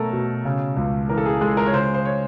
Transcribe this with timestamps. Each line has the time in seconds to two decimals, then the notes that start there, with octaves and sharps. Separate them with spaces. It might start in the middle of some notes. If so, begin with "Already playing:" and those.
Already playing: B2 F#3 A3 A4 A#4
0.13 B2
0.45 C#3
0.77 C#2
1.09 E3 A#4
1.17 A4
1.25 G#4
1.41 G#3 A4
1.57 A#4
1.66 C#5
1.73 C#3 C5
1.94 C5
2.05 C#5